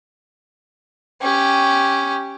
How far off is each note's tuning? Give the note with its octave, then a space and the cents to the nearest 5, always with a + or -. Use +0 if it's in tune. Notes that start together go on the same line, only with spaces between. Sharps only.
C#4 +0 G4 +0